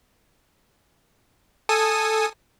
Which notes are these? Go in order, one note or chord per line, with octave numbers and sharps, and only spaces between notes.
A4 G#5 D#6